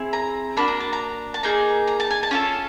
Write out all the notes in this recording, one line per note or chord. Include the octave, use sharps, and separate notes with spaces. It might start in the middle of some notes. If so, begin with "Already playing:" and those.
Already playing: C4 E4 G#4
A#5
A#3 D4 F#4 B5
A#5
A5
A#5
A5
A#3 D#4 G#4 A#5
A#5
A5
G#5
A5
C#4 F4 A4